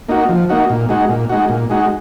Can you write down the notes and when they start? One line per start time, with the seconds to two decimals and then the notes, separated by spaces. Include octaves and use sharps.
0.09 A#3 D#4 F#4
0.29 F3
0.49 A#3 D#4 F#4
0.70 A#2
0.89 G#3 D#4 F#4
1.09 A#2
1.29 G#3 D#4 F#4
1.49 A#2
1.70 G#3 D#4 F#4